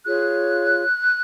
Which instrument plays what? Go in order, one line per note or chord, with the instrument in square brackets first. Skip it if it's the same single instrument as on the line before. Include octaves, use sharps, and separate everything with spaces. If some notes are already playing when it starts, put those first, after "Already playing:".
[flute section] F4 G#4 C#5 F#6